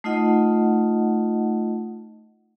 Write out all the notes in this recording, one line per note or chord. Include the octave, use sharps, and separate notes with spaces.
A3 D#4 F4 D#5 F#5